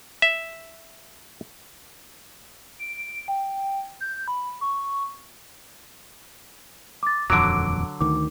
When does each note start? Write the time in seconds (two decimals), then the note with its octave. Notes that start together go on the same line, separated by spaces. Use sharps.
0.22 E5
2.79 D7
3.28 G5
4.01 G6
4.28 B5
4.61 C#6
7.03 D6 A6
7.30 D#1 F2 D3 F#3 D6 D7
8.01 D2 D#3 D6